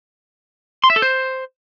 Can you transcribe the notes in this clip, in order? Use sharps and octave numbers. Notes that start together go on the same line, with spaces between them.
C6
E5
A4
C5